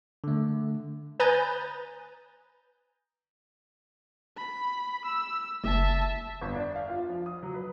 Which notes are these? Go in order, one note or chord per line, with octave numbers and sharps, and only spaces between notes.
D3 A3
B4 G#5 A#5 D#6 G6 A6
B5
E6
F#1 E5 A5
G1
D4
F5
F4
F3
D#6
F#3
B4